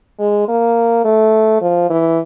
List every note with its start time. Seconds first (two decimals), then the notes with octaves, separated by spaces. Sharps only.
0.20 G#3
0.48 A#3
1.05 A3
1.61 F3
1.90 E3